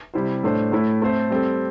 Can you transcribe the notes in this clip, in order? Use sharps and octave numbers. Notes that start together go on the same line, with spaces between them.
C3 G3 E4 C5
A2 A3 D4 C5
A2 A3 E4
A3 C4 A4 C5
G3 C4 A4